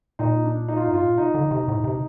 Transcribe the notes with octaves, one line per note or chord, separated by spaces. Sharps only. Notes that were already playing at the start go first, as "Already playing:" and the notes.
A#2 D#4
D4
D#4
F4
G2 D#4
A2 F4
A#2
C3 D#4
D3
C3
A2
C3